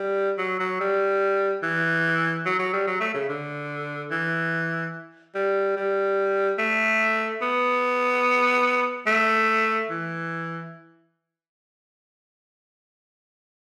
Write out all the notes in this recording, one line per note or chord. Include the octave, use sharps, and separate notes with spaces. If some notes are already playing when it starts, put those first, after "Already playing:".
Already playing: G3
F#3
F#3
G3
E3
F#3
F#3
G3
F#3
A3
C#3
D3
E3
G3
G3
A3
B3
A3
E3